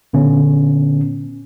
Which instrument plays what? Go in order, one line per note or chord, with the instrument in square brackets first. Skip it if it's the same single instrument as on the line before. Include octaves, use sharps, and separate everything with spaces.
[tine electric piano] A#2 D3 B3 C#4